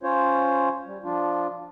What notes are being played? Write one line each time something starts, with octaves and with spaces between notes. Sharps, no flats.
C#4 F4 C5 C#5
G3
F3 D4 F4